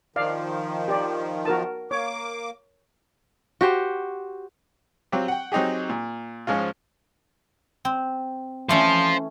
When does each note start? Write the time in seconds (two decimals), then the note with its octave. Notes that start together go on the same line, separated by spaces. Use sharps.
0.16 D#3 F3 D5 F5
0.88 G4 D5
1.45 F#4 A#4 A5
1.91 A#3 C#5 D6
3.61 F#4 G4 C5
5.12 F#3 C4 F4 G4
5.28 F#5 G5
5.52 F#3 C4 D#4 G4 G#4
5.89 A#2
6.47 G#2 F3 G#3 C#4 F4
7.85 C4
8.69 E3 A3 C#4 C5 F5